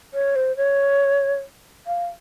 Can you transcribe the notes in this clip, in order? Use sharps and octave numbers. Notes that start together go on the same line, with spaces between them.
C#5
C5
C#5
F5